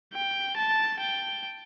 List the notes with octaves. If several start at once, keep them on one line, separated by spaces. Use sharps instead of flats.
G5
A5
G5